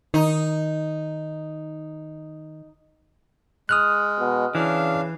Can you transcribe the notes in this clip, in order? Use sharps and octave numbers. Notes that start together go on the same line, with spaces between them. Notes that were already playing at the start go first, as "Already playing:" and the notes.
D#3 D#4
G#3 D#6 F6 F#6
B2
C#3 E3 D4 F5